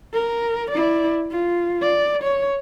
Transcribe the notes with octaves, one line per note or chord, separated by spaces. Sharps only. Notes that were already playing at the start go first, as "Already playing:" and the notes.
A#4
E4 D5
F4
D5
C#5